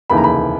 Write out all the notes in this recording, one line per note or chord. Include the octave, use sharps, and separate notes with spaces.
F1 D#2 C#3 E3 B5
A#5
B5